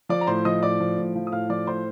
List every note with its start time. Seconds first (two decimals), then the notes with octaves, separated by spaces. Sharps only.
0.09 F3 D5 D6
0.21 A#5
0.27 A2 C5 C6
0.45 F3 D#5 D#6
0.62 A2 D5 D6
0.80 F3
0.98 A2
1.16 F3
1.27 D#6
1.32 A2 F5 F6
1.49 F3 D5 D6
1.67 A2 C5 C6